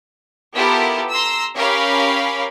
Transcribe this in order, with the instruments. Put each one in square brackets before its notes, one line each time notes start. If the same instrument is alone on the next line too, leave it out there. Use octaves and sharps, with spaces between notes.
[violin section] B3 E4 F4 G4 A4 A#4
A#5 C6 E6
C#4 G4 A#4 C#5 F5 B5